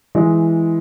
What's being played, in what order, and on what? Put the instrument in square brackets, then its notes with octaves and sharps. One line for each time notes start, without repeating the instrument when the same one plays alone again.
[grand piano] E3 G#3